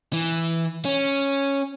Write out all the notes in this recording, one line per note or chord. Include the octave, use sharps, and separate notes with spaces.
E3
C#4